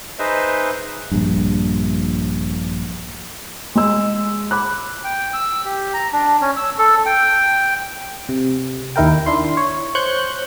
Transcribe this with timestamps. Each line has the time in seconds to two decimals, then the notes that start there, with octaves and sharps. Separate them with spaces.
0.19 D#4 G#4 B4 C5 D#5 E5
1.11 A#1 G2
3.75 G#3 E6
4.51 B5 D6 F#6
5.04 G5
5.33 E6
5.65 G4
5.94 A#5
6.13 D4
6.41 C#4
6.57 E6
6.78 A4
7.06 G5
8.29 C3
8.96 D#2 D#3 E4 A#4 G5
9.26 D4 E4 C6
9.57 C#5
9.95 C5 C#5 C#6 F#6 G6